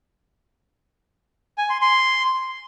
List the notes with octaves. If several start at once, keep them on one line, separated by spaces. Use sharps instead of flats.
G#5
C6
C6